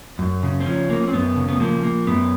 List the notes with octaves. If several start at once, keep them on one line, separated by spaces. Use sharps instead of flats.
F#2
C#3
C4
F3 C#4
A#3
C4
F#2 B3
C#3
B3
F3 A#3
A#3
F#2 B3